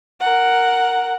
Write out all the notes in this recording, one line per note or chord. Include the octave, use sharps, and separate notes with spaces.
A#4 F#5